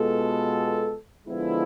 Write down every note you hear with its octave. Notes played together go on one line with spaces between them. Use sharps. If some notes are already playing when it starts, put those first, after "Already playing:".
Already playing: B2 G#3 B3 F4 A4
D3 F3 G#3 B3 E4